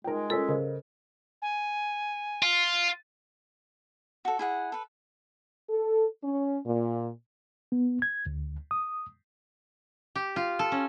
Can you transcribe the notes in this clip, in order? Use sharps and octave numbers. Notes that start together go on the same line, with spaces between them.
G#3 D#4 F4 A#4 G5
C#4 F4 A4 A#4 E6 B6
C#3 A#4 C5 D#5
G#5
F4
F#4 A4
E4 G#4 F#5
A4 B4
A4
C#4
A#2
B3
G#6
D2
D#6
G4
F4
A4
C#4